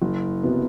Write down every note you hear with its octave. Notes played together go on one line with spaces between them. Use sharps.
F#1
C3 F#3 B3